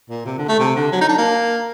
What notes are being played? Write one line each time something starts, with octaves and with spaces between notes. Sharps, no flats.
A#2
C3
D3
A3
C3
D3
F#3
D#4
D4
A#3